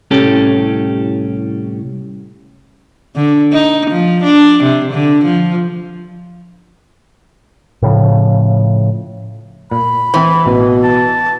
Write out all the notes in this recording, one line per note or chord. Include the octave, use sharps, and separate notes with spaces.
C2 A2 C#4 G4 A4
D3
D#4
F3
D4
C3
D3
F3
A2 C#3 F3
A#2 B5
E3 C4 E4 C5
A1 B2
A5